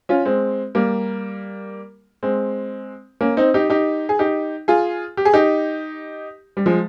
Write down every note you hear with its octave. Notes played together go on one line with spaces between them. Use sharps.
C#4 F4
G#3 C4
G3 A#3
G#3 C4
A#3 C#4
C4 D#4
D#4 G4
D#4 G4
G#4
D#4 G4
F4 G#4
G4
G#4
D#4 G4
G3
F3 G#3